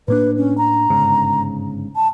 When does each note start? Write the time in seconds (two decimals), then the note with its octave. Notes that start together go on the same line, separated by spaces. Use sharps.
0.08 A2 A#3 D4 B4
0.37 C#4
0.58 A#5
0.90 G1 G#2 C#3
1.96 A5